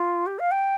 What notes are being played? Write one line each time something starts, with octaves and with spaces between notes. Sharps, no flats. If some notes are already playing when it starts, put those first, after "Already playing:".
Already playing: F4
G4
F5
G5